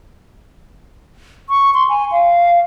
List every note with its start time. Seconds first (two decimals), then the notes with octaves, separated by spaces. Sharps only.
1.49 C#6
1.74 C6
1.89 G#5
2.12 F5